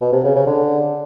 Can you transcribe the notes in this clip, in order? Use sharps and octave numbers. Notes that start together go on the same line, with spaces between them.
B2
C3
C#3
C#3
D3